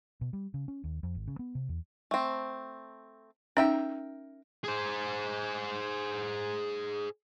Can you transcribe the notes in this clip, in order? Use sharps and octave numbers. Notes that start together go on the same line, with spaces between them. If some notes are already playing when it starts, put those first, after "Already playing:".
B2
G3
C#3
C#4
D#2
F2
G#1
C#3
B3
C3
E2
A3 C4
C#4 D#4 A#4 E5 G5
G#4 C5